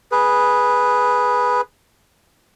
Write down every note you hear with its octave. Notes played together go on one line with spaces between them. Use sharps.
G#4 B4